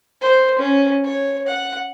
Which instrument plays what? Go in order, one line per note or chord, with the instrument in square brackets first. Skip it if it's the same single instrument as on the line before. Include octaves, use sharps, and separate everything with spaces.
[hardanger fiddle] C5
C#4
C#5
F#5